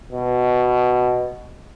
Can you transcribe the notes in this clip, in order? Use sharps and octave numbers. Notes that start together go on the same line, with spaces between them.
B2